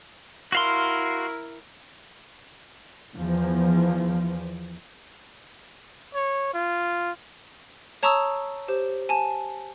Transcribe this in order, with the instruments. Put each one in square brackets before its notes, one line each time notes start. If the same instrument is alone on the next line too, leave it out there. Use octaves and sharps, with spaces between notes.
[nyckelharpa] E4 A#4 [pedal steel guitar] F#4 F5 C6
[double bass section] E2 F3
[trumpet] C#5
F4
[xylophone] C#5 A5 A#5 C#6 D#6 E6
G4 C5
G#5 A5